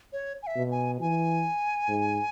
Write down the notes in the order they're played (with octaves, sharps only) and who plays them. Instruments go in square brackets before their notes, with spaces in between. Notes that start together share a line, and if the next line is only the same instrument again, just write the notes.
[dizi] C#5
G#5
E5
[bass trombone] B2
[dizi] G#5
[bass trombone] E3 [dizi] G#5
[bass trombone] G#2